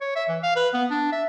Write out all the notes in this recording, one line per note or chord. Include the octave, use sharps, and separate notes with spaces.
C#5
E5
E3
F5
B4
B3
D4
E5